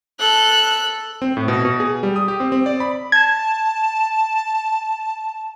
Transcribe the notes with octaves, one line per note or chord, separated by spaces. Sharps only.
A4 F#6
C4
A2
B2
B2
G#4
G3
D#6
G4
C4
C4
D5
B5
A5 G#6